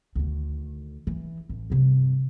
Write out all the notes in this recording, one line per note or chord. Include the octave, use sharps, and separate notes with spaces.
D2 D#3
E3
A1
G2 C3